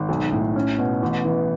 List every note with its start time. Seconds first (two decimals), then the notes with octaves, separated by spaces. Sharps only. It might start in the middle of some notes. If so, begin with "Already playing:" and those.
Already playing: G#1
0.09 B1
0.32 A2
0.56 C#4
0.78 B2
1.02 A1
1.25 E3